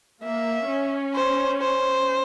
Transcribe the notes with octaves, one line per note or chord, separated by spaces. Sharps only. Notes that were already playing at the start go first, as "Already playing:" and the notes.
A#3 E5
C#4
C5
C5